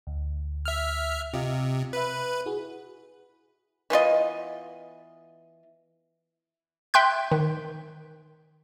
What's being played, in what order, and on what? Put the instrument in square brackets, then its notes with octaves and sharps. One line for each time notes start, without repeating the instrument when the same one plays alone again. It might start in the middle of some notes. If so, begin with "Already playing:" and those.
[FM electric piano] D2
[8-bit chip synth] E5 F6
[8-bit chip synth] C3 [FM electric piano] F4 D#5 F5
[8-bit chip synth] B4 [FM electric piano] E5 B6
[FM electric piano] E4 F#4 G#4
[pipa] E3 B3 F4 D#5
[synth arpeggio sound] E5 G5 C6 F#6 G6
D#3